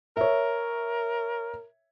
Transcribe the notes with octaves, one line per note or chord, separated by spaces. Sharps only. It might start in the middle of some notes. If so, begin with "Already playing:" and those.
A#4 C#5 E5